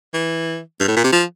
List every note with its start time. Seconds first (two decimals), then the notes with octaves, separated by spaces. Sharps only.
0.14 E3
0.80 G2
0.88 A2
0.96 A#2
1.04 C3
1.12 F3